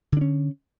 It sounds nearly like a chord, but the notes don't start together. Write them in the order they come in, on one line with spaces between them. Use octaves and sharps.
D3 D4 C#4